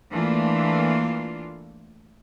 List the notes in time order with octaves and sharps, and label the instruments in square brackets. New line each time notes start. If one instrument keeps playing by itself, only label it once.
[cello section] E3 A3 A#3 D4 F4